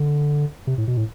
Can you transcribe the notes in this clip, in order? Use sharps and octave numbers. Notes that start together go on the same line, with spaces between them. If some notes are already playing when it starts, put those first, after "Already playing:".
Already playing: D3
C3
A2
B2
A2